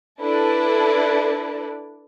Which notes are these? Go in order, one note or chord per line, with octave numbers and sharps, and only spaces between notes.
D4 E4 A4 B4 D5